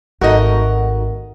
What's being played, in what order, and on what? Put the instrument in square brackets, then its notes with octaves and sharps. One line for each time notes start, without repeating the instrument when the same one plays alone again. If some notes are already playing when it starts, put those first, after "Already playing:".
[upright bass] G#1 [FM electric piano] A3 D#4 F#4 [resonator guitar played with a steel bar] A#4 D#5